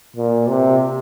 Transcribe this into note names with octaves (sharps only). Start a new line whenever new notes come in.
A#2
C3